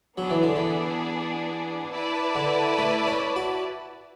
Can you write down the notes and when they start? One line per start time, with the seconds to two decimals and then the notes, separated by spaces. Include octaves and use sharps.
0.17 F#3 B3 D4 G#4 D5
0.30 E3
0.43 D3
0.56 E3
1.91 E4 B4 D5 A5
2.35 D3
2.78 A3
3.07 C#4
3.36 F#4